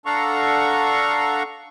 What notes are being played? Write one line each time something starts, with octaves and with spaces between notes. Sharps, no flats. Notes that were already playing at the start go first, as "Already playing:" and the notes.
D4 A4 F5 F#5 A#5 C#6